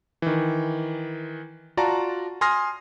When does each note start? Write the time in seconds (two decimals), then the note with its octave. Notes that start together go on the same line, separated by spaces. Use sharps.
0.22 D#3 E3
1.77 F4 F#4 D5 A5 A#5
2.41 G#5 C6 D#6 F6 A#6